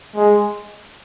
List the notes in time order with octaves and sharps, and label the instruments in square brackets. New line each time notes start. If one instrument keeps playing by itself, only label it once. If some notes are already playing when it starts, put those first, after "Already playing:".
[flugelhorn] G#3